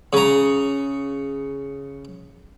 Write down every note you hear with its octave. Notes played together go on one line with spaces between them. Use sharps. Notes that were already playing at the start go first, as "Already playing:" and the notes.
C#3 A#5